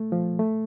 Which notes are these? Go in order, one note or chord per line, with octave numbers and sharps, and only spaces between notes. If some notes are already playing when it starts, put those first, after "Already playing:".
Already playing: A3
F3
A3